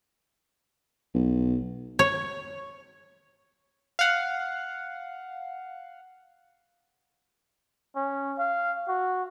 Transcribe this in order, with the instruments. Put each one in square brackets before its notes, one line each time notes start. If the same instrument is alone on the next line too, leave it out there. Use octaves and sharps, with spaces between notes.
[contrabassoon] B1
[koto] C#5
[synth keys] F5 F#5
[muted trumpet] C#4
F5
F#4